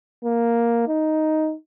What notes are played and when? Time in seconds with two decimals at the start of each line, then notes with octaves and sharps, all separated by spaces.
0.25 A#3
0.88 D#4